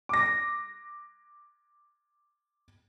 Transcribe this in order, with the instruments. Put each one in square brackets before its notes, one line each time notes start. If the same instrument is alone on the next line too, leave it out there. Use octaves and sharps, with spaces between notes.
[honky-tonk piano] D6 A#6